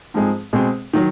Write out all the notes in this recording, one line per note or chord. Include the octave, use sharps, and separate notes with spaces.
G#2 F3 G#3 C4
B2 G#3 C4
D#3 F#3